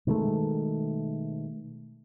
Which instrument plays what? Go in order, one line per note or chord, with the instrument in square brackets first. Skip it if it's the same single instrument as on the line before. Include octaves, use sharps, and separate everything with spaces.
[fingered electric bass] B2 D#3 G#3 A3